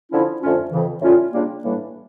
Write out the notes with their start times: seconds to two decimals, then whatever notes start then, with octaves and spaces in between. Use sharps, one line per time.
0.11 D3 F3 C#4 E4
0.42 F2 D3 A3 C#4 F4
0.71 F2 C#3 E3
1.02 A2 G3 C#4 F4
1.33 C#3 G3 A#3 D4 F4
1.63 A2 E3 G3 A#3 D4